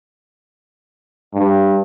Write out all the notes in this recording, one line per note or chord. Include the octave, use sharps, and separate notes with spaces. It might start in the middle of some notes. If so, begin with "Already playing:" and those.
G2